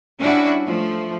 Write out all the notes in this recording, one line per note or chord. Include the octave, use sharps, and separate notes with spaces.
G3 C#4 D4 E4 F#4
F3 A3